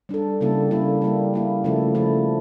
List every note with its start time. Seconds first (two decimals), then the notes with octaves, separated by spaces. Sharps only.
0.09 G3 D4 A4
0.41 C#3 G3 A#3 E4 A4
0.71 C#3 G3 A#3 E4 A4
1.01 G3 A#3 E4
1.34 G3 A#3 E4
1.64 C#3 F3 A3 E4 A4
1.95 C#3 F3 A3 E4 A4